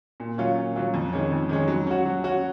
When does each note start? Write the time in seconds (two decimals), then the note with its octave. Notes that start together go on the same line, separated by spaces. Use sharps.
0.20 A#2
0.38 F#3 C#4 F4
0.57 A#2
0.76 F#3 C#4 F4
0.94 F2
1.13 D#3 G#3 C#4
1.32 F2
1.49 D#3 G#3 C#4
1.68 F#3
1.86 C#4 F#4
2.05 F#3
2.24 C#4 F#4